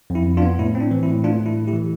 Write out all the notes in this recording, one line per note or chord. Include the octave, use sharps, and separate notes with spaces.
F2
E4
F2
D4 F4
B3
A2 E4
C4
D4
E3
E4
A2
A3 D4 F4
A2
E4
A3
E4 G4
E3